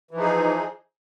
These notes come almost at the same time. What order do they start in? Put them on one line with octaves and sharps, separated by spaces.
E3 F3 D#4 G#4